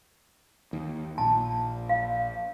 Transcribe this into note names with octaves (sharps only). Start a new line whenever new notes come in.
D#2
A#1 A#2 A5
F5